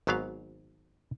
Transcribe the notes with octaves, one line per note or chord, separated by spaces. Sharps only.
G#1 G#2 F#3 B3 F5